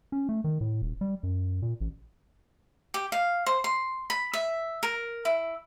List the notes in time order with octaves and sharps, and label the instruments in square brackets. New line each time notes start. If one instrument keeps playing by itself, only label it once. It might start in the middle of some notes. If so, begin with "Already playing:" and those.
[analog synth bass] C#4
A3
D#3
A2
D#1
G3
F#2
A#2
A1
[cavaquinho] G4
F5
C5
C6
B5
E5
A#4
E4